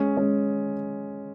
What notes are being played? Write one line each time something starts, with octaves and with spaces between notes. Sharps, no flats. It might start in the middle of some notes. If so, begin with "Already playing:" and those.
Already playing: G#3 C#4
G#3 C#4